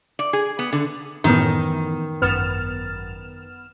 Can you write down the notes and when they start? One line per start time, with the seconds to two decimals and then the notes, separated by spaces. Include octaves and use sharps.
0.19 D5
0.33 G#4
0.59 B3
0.73 D3
1.24 F#2 A2 D#3 E3 B3
2.22 G#1 F#2 B3 F6 A6 E7